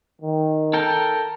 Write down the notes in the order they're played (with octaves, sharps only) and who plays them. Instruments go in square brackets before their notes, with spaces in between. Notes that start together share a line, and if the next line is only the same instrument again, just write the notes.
[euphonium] D#3
[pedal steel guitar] A4 A#4 G5